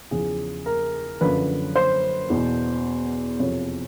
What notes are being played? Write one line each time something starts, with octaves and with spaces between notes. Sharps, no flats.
E2 C#3 F3 G#4
A#4
F#2 D3 F3 B4
C5
E2 B2
F2 C3 F3 C#5